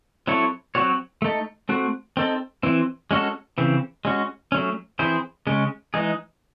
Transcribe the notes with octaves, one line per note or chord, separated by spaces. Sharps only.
F#3 C4 E4 A4 C#5
F#3 C4 F#4 C#5
A3 D#4 A4
A3 C4 F#4
C4 D#4 A4
E3 C4 E4
G#3 C#4 F#4 A4
C#3 E3 C4
G#3 C#4 F#4
F#3 A3 C#4
E3 C4 E4 G#4 C5
C#3 G#3 C#4
E3 G#3 D#4 G#4